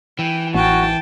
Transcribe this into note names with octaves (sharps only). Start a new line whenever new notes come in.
E3 G5
A1 F#4 G5 A5